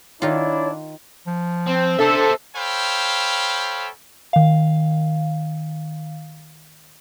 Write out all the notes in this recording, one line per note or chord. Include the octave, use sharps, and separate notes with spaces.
D#3 D4 E4 F4 C#5
F3
C4
D4 A4 C5 E5
A4 C5 C#5 F5 G5 B5
D#3 F5